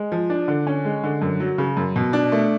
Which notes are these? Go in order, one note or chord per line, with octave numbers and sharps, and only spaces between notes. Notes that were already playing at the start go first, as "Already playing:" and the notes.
Already playing: G#3
F3
D4
D3
C#4
G#3
D3
F#2
F#3
C#3
F#2
B2
D4
A3